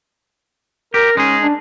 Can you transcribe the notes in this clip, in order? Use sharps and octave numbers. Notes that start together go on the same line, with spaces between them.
G4 A#4
G#3 C#4 D#4 G#4
D4